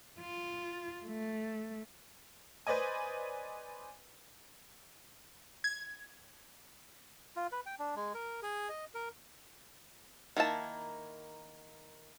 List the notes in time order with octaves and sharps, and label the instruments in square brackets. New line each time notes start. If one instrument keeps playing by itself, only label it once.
[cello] F4
A3
[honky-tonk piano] B4 C5 D5 D#5 G#5
[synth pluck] G#6
[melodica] F4
B4
G5
D4
G#3
A#4
G#4
D#5
A#4
[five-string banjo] D#3 A#3 E4 A5